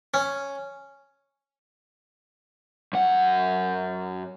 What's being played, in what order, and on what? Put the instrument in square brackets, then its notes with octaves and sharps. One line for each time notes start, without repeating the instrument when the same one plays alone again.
[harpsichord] C#4
[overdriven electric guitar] F#2 F#5